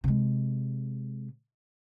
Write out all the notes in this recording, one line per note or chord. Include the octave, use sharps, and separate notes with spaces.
C3 G#3